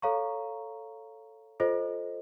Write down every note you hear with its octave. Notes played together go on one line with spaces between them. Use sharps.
A4 C#5 F5 A#5 C#6
F4 A4 C5 D#5